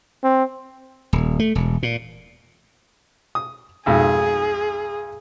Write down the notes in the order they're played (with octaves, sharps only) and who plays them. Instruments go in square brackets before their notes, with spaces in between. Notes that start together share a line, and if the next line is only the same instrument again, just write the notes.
[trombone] C4
[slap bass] D#1
A3
E1
A#2
[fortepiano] D#6
[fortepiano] B1 F2 G#2 [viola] G#4